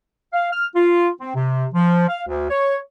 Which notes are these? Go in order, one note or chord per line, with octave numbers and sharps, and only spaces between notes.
F5
F6
F4
C4
C3
F3
F5
D2
C#5